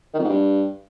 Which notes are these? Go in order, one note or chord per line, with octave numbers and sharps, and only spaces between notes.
D#3
F2
G#2
G2